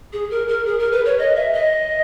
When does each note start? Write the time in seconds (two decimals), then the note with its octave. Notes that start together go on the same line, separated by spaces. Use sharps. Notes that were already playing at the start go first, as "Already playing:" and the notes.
0.13 G#4
0.30 A#4
0.48 A#4
0.66 G#4
0.79 A#4
0.92 B4
1.05 C#5
1.19 D#5
1.36 E5
1.53 D#5